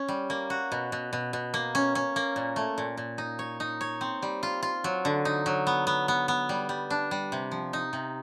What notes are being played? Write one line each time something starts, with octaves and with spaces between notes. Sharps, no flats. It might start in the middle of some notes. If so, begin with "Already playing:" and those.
Already playing: C#4
G3
A#3
F#4
B2
B2
B2
B2
A#3
C#4
C#4
A#3
A#2
A3
A#2
A#2
D#4
C#5
D#4
C#5
C4
G3
F4
F4
F#3
D3
D#4
F#3
B3
B3
B3
B3
G3
G3
D4
G3
C3
F3
D#4
C3